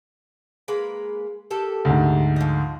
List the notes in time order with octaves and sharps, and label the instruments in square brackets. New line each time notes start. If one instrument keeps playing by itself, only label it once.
[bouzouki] G#3 A#3 B4
A#3 G4 A4
[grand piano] D2 G#2
[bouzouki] F3 D#5